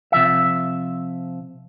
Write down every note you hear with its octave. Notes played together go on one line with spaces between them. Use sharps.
C3 F3 E5